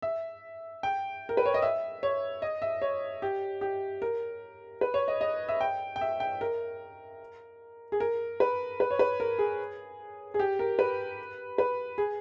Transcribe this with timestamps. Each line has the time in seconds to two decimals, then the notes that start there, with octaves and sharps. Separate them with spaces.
0.02 E5
0.83 G5
1.29 A#4
1.37 B4
1.45 C#5
1.54 D#5
1.62 E5
2.03 C#5
2.42 D#5
2.62 E5
2.82 C#5
3.22 G4
3.61 G4
4.02 A#4
4.81 B4
4.94 C#5
5.08 D#5
5.21 D#5
5.48 E5
5.61 G5
5.96 G5
6.01 E5
6.20 G5
6.41 A#4
7.92 G#4
8.00 A#4
8.40 B4
8.80 B4
8.91 C#5
8.99 B4
9.20 A#4
9.39 G#4
10.34 G#4
10.39 G4
10.59 A#4
10.79 B4
11.58 B4
11.98 G#4